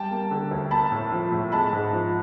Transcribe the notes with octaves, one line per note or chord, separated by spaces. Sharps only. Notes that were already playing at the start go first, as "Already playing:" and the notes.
Already playing: G3 G5 A5
A#3
D3
D2
A#3 A5 B5
A2
F3
A2
G#3 A5 B5
G#2
F3